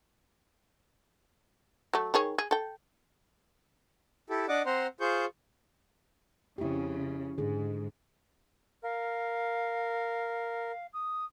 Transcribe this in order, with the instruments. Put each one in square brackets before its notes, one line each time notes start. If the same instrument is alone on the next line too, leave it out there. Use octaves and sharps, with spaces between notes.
[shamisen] F#3 A3
D#3 G#4 C#5
G#4
A4 G5
[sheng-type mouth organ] E4 G4 A4
D4 D5 D#5 F#5 D6
C4 C5 F#5 A#5 C6
F4 G#4 C5 C#6 G6
[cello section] F2 C#3 [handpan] E4 G4
[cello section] G#2 [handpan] D3 G#4
[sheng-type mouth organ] A#4 [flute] F5
[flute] D#6